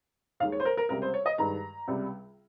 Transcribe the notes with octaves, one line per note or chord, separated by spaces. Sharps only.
D#2 D#3 G#3 F5
C#5
C5
A#4
A#4
C#2 C3 G3 A#4
C5
C#5
D#5
G2 D#3 G#3 A#5
C#2 C3 G3